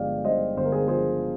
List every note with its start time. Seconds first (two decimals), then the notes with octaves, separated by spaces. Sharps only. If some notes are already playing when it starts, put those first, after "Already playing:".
Already playing: G1 F3 G#3 D5 F5 G5
0.25 G2 C5 D#5
0.57 G1 C5
0.65 A#4
0.72 G#4 C5
0.88 F3 G#4 C5